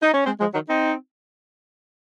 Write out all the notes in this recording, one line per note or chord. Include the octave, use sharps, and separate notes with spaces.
D#4
C#4
G#3 C4
F3 G#3
D#3 F#3
C4 D#4